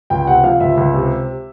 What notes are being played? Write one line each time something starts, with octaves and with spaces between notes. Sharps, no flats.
C#2 G5
C3 F#5
F3 F5
C#2 E5
C#2
C3